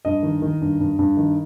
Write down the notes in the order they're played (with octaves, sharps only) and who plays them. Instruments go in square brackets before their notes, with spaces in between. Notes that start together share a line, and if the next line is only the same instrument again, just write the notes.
[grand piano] G2 D#5
D#3
D#3
G2
G2
G2
D#3